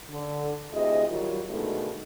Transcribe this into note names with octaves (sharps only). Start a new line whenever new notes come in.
D3
D2 C3 E4 G#4 D#5
D#3 F#3 G3 F4 G4
B2 D3 D#3 G#3 A3 D#4